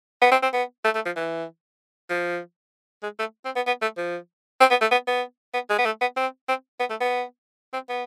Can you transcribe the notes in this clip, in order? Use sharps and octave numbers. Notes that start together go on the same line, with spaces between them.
B3
C4
C4
B3
A3
A3
F3
E3
F3
G#3
A3
C4
B3
B3
A3
F3
C4
B3
A3
B3
B3
B3
G#3
B3
A3
B3
C4
C4
B3
A3
B3
C4
B3